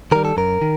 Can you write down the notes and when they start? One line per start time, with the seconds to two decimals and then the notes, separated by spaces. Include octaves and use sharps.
0.12 D#3 G3 A#4
0.25 A4
0.37 F#2 A#4
0.62 D#3